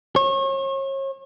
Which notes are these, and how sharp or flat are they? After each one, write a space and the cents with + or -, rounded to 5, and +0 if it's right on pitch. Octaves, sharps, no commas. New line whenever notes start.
C#5 -35